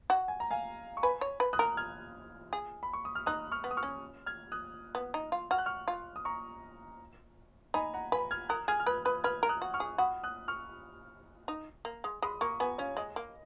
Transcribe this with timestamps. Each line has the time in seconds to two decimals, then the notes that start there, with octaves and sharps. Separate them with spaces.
0.10 F#4
0.28 G#5
0.40 A#5
0.51 F5 G#5
0.97 C#6
1.03 B4 G#5 B5
1.21 C#5
1.40 B4
1.53 D#6 F#6
1.59 A#4
1.77 F6 G#6
2.53 G#4
2.83 B5
2.93 C#6
3.05 D#6
3.15 F6
3.26 D#4 D#6 F#6
3.51 C#6 F6
3.64 B3
3.71 D#6
3.77 C#6 F6
3.83 C#4
4.26 F6 G#6
4.52 D#6 F#6
4.95 B3
5.14 D#4
5.32 F4
5.51 F#4 F6
5.58 F#6
5.66 C#6 F6
5.88 F4
6.16 D#6
6.25 A#5 C#6
7.74 D#4 G#5 B5
7.94 F#5 A#5
8.12 B4 G#5 B5
8.31 F6 G#6
8.49 A#4 D#6 F#6
8.68 G#4 F6 G#6
8.80 F6
8.86 B4 D#6 F#6
9.05 B4 D#6 F#6
9.24 B4 F6 G#6
9.43 A#4
9.49 D#6 F#6
9.62 F#4
9.74 C#6 F6
9.80 G#4
9.98 F#4 B5 D#6
10.23 D#6 F#6
10.48 C#6 F6
11.48 D#4
11.85 A#3
12.04 G#3
12.22 G#3 B5 D#6
12.41 A#3 A#5 C#6
12.60 B3 G#5 B5
12.78 C#4 C#5 F5
12.97 G#3 D#5
13.16 A#3